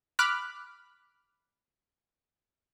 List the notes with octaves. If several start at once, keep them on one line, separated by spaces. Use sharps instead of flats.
B5 D6 F6 F#6 B6